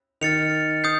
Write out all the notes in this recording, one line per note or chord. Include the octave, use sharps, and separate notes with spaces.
D#3 F6 A6 C#7 F7
D#6 G6 C7